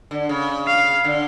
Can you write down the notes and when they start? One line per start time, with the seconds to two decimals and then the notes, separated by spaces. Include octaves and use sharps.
0.11 D3
0.29 C#3
0.67 F5
1.04 D3